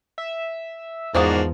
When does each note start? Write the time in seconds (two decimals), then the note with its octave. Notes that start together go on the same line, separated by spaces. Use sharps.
0.18 E5
1.15 E2 G#2 F3 A#3 D4 D#4 F#4 A5